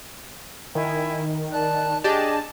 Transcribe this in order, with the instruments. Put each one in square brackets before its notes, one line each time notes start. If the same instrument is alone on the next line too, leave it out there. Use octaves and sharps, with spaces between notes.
[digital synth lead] D#3 [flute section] E4 G#5
[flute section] D5 A5 F#6
[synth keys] D4 G4 D5 [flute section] G#4 D#5 [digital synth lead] A5